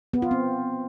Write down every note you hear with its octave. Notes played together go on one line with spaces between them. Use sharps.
B3
F4
C4